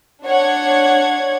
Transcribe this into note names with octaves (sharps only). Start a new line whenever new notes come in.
D4 C#5 F#5 G#6